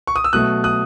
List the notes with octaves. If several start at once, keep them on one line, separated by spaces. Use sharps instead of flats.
C#6
D#6
E6
B2 F#3 A3 D#6 F#6
D#6 F#6